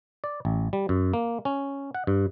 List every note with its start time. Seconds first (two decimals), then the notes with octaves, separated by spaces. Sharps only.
0.24 D5
0.45 A1
0.73 G3
0.89 F#2
1.14 A#3
1.45 C#4
1.95 F#5
2.07 G2